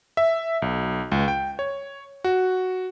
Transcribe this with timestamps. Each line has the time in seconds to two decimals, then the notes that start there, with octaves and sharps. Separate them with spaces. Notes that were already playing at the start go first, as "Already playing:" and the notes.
0.17 E5
0.62 B1
1.12 C#2
1.28 G5
1.59 C#5
2.24 F#4